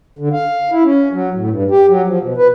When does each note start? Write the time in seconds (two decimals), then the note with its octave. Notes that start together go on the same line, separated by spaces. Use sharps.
0.19 D3
0.33 F5
0.72 E4
0.84 C#4
1.13 F#3
1.34 A2
1.50 G2
1.71 G4
1.89 F#3
2.08 F3
2.22 B2
2.38 B4